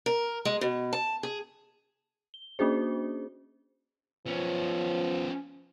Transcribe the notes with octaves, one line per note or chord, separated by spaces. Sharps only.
A#4
G#3
B2
A5
G#4
G7
A#3 C#4 D4 F#4 G#4 C5
F3 B3 C#4